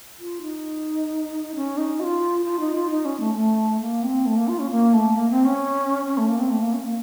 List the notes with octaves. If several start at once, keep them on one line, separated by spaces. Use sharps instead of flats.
F4
D#4
C#4
D#4
F#4
F4
F4
D#4
F4
D#4
C#4
A3
A3
A#3
C4
A3
A#3
F4
C#4
A#3
A3
A#3
C4
C#4
C#4
A3
A#3
C4
A3
A#3
C#4
A#3